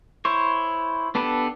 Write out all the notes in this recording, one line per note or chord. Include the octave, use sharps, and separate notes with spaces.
E4 C5 C#5
B3 D4 G4 A4 B4